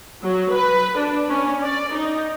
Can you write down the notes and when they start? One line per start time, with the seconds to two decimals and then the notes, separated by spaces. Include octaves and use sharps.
0.23 F#3
0.52 B4
0.97 D4
1.29 C#4
1.62 D5
1.93 D#4